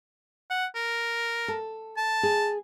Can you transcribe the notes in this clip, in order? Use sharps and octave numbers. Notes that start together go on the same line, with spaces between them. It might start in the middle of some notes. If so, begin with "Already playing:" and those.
F#5
A#4
A4
A5
G#4